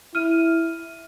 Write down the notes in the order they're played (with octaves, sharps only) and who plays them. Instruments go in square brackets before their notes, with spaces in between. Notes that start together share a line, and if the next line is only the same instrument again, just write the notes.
[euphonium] E4 [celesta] F6 D#7